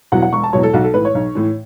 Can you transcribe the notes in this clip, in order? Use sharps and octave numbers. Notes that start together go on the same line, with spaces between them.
E2 B2 F#3 F#5
F#5
E1 C#6
A5
E2 B2 F#3 C#5
A4
B1 F#4
A4
A2 E3 B4
C#5
B1
A2 E3